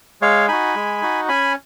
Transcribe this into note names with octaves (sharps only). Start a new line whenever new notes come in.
G#3 C#5 F5
D#4 F#4 G#5 B5
G#3
D#4 F#4
C#4 G#5 B5